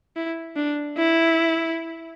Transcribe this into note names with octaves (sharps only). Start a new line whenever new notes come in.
E4
D4
E4